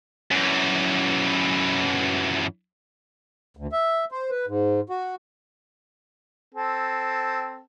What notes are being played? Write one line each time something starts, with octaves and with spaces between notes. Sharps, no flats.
F#2 E3
D2
E5
C5
B4
G#2
F#4
C4 A4